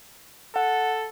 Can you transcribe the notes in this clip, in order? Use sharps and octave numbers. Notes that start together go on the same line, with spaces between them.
A4 F#5